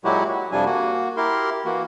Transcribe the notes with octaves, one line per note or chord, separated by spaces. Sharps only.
A#2 F#3 G#3 E4 F#4 G4
F#4
F2 C3 F3 G3 D4 G#5
A#3 F#4
E4 G4 A#4 C6
E3 A#3 F#4